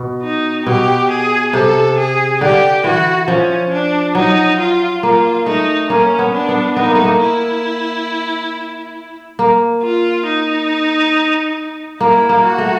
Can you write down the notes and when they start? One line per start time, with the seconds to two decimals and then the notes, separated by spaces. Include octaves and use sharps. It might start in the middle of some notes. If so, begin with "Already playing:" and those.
Already playing: B2
0.23 D#4
0.66 B2 G4
1.11 G#4
1.53 C3 A4
1.97 G#4
2.41 D3 G4
2.84 E3 F#4
3.28 F3 C#4
3.72 D4
4.15 F#3 D#4
4.59 F4
5.02 A#3 F4
5.46 A3 D#4
5.90 A#3 C#4
6.19 B3
6.34 D4
6.49 B3
6.76 B3 D#4
6.85 A#3
6.95 A3
7.05 A#3
7.21 E4
9.39 A#3
9.82 F4
10.26 D#4
12.00 A#3 E4
12.29 A#3
12.43 F#4
12.58 A3